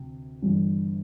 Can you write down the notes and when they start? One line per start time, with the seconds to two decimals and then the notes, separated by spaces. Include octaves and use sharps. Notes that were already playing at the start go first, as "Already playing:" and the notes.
Already playing: D2 C3
0.42 G1 G2 E3